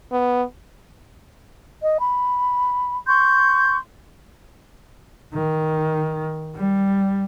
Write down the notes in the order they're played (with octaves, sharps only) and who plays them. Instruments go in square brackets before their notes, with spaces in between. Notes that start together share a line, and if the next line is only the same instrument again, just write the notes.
[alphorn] B3
[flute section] D#5
B5
C6 C#6 G6
[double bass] D#3
G3